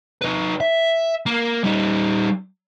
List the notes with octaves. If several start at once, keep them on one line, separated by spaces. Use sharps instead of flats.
D#4 B4
E5
A#3
G3 D#4